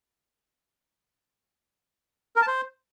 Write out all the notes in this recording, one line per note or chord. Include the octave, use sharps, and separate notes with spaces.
A#4
A5
C5